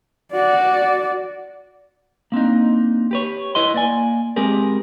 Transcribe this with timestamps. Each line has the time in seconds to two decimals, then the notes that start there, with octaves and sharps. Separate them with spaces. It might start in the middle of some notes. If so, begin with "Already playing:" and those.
0.32 F#4 D5
2.32 A#3 C4 D4 D#4
3.11 G4 B4 C#5
3.55 E4 B4 D#5 C6
3.74 A#3 D5 G#5
4.36 G#3 C4 G4 G#4 A#4 B4